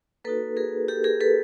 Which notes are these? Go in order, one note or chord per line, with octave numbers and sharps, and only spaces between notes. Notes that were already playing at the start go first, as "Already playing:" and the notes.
A#3 D#4 F#4 A4 B4
G#4 A#4
G4 A4
G#4 A#4
A4 B4